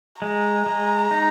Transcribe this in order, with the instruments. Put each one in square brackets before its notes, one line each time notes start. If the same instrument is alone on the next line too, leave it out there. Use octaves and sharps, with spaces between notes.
[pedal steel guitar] G#3 [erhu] A#5
[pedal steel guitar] G#3
D#4